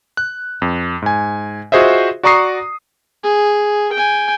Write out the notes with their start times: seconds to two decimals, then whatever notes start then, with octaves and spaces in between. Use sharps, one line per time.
0.17 F#6
0.62 F2
1.02 G#2 G#5
1.72 F4 F#4 G#4 C5 D#5 E5
2.23 F#4 D5 A#5 C#6 D#6 C7
3.24 G#4
3.93 G5 G#5